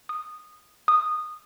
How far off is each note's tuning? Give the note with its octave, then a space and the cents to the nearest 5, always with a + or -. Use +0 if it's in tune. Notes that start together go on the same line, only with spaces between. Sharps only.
D#6 -10
D#6 -15